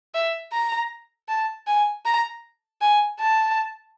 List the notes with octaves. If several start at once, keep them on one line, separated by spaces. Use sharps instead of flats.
E5
A#5
A5
G#5
A#5
G#5
A5